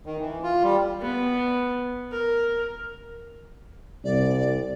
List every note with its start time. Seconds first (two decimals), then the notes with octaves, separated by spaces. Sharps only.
0.06 D#3
0.20 E3
0.43 F4
0.63 G3
1.01 B3
2.11 A#4
4.05 C2 D5